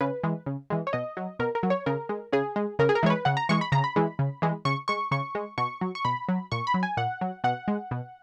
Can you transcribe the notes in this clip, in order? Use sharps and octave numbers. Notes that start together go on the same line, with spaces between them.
C#3 B4
E3 G#3
C#3
E3 G#3
C#5
B2 D#5
F#3
B2 A#4
A#4
F#3
C#5
C#3 A#4
G#3
C#3 G#4
G#3
C#3 A#4
G#4
A#4
E3 G#3 C#5
B4
C#3 F#5
A#5
E3 G#3 C#6
B5
C#3 A#5
B5
E3 G#3
C#3
E3 G#3
C#3 C#6
G#3 C#6
C#3 C#6
G#3
B2 C#6
F#3
C#6
B2 B5
F#3
A#2 C#6
B5
F#3
G#5
A#2 F#5
F#3
B2 F#5
G#3
B2